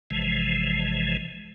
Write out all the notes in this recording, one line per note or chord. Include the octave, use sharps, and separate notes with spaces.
A1 C3 E3 F3 G#3